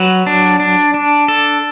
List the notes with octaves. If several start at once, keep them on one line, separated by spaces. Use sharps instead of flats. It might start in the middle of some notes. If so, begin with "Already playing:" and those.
Already playing: F#3 B4
D4
D4
D4
A4